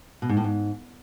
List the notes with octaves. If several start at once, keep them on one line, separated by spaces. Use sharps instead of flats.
B2
G#2
A2
G#2